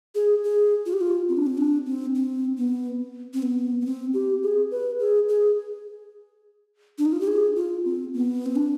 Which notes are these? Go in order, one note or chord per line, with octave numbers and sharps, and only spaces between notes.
G#4
G#4
F4
G4
F4
C4
D4
C4
D4
C4
C4
B3
C4
B3
B3
C4
G4
G#4
B4
G#4
G#4
D4
D#4
F4
G4
G#4
F4
C4
B3
C4
D4